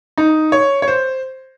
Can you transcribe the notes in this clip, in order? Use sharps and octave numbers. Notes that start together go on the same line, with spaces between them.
D#4
C#5
C#5
C5